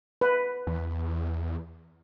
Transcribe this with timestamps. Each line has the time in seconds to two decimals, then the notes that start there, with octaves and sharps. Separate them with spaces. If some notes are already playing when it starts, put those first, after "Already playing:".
0.21 B4
0.67 E2